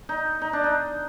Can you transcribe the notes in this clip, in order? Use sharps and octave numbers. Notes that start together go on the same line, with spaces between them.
D#4
D#4
D4
D#4